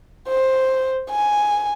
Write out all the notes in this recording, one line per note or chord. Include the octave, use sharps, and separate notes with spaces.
C5
G#5